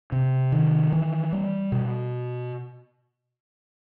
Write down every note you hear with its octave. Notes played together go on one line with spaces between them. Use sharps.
C3
D#3
E3
G3
B2